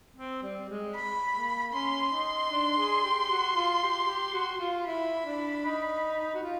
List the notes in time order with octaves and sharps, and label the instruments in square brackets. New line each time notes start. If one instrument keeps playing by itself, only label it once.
[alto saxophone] C4
G3
G#3
[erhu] B5
[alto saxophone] A#3
[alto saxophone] C#4 [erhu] C6
[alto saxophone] D#4
D4
G#4
G4
F#4
F4
G4
G4
F#4
F#4
F4
[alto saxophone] E4 [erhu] B5
[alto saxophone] D4
D#4
F#4
F4